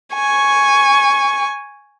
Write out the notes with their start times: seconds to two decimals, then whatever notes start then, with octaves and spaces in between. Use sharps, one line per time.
0.14 G#5 C#6